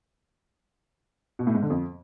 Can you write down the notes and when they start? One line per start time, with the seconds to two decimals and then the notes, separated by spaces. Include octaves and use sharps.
1.39 B2
1.47 A2
1.55 G#2
1.62 D3
1.70 F2